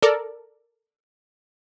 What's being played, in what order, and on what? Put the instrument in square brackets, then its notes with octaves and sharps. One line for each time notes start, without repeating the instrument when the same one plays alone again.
[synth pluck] A4 A#4 D5